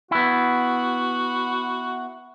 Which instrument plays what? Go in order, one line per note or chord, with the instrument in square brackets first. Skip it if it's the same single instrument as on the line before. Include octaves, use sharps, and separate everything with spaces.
[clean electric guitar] B3 E4 [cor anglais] F#4